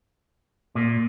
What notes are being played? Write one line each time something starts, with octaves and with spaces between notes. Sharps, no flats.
A#2